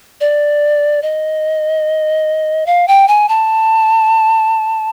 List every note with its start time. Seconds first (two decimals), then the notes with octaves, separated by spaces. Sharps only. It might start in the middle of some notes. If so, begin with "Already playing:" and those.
0.21 D5
1.02 D#5
2.66 F5
2.88 G5
3.08 G#5
3.29 A5